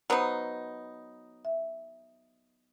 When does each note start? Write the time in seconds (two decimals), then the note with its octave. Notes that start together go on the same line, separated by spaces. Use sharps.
0.10 F#3 B3 D#4 C5
1.45 E5